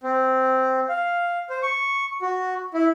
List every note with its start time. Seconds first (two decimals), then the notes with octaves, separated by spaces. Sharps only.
0.03 C4
0.89 F5
1.50 C5
1.63 C#6
2.22 F#4
2.74 E4